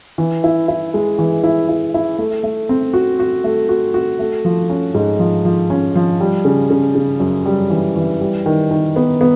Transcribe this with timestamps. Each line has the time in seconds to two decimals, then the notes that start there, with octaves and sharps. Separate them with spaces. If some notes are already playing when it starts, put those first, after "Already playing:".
0.18 E3
0.44 E4
0.68 E4
0.94 G#3
1.18 E3
1.44 E4
1.69 E4
1.94 E4
2.18 A3
2.43 A3
2.69 C4
2.94 F#4
3.20 F#4
3.44 A3
3.69 F#4
3.94 F#4
4.19 A3
4.45 F3
4.70 C#4
4.95 G#2
5.19 F3
5.45 F3
5.70 C#4
5.95 F3
6.20 G3
6.45 C#3
6.70 C#3
6.95 C#3
7.20 F#2
7.45 G3
7.70 E3
7.96 E3
8.21 G3
8.46 D#3
8.71 D#3
8.96 B3
9.21 B3